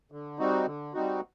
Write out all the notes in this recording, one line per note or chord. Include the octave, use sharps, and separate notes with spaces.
D3
G3 C4 D#4 F#4
D3
G3 C4 D#4 F#4